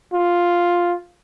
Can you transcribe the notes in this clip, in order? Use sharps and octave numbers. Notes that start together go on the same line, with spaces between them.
F4